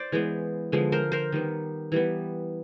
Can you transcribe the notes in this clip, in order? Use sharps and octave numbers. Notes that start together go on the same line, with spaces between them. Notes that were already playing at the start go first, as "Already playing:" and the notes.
Already playing: C5 D5
E3 G#3 B3
D3 F3 G#3 B3
A#4 C5
A#4 C5
D#3 G3 B3
E3 G3 B3